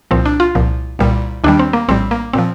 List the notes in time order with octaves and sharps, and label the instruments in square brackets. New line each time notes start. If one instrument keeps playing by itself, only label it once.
[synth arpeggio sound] C2 A#2 F3 C4
D4
F4
C2 A#2 F3
C2 A#2 G3
D#2 D#3 G3 D4
C4
A#3
A#1 A2 G3 C4
A#3
A#2 F3 C4